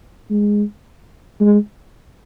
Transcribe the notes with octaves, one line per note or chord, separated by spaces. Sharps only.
G#3
G#3